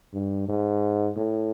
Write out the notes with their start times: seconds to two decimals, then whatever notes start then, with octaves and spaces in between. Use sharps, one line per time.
0.13 G2
0.48 G#2
1.17 A2